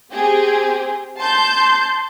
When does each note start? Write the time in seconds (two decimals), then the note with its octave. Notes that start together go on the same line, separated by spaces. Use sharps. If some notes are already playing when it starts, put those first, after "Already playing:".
0.13 C4 G4 G#4
1.20 A5 C6 G6